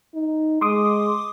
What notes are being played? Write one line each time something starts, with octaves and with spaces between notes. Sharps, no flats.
D#4
G#3 C6 D6 D#6